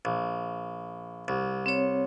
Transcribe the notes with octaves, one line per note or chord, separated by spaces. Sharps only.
A#1
C2
C4 C#5